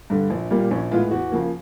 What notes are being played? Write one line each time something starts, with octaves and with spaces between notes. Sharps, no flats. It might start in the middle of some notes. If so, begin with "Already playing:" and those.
G2 D3
A#1
A#2 G3 A#3
A#1 C#4
A2 E3 G#3 B3 F4
E2 F#4
C#3 F3 A#3